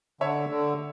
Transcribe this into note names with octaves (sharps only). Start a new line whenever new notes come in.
D3 C#5 E5
D3